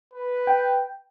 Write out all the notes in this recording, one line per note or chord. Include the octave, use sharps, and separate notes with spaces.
B4
G5